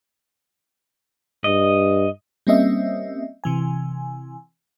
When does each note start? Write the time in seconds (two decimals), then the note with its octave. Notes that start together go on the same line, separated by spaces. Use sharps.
1.44 G2 D#5
2.47 G3 A#3 C4 C#4 D#5 E5
3.44 C3 E3 G#5